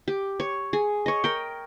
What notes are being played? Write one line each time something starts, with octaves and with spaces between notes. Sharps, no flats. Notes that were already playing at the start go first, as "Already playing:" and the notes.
G4
C#5
G#4
C#5 D#5
A#4 G5